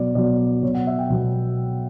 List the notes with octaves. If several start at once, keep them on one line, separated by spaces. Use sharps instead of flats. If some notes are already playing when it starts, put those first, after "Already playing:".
Already playing: B2 F#3 B3 D5
B2 F#3 B3 D5
B2 F#3 B3 C#5
F#5
E5
G5
B2 F#3 B3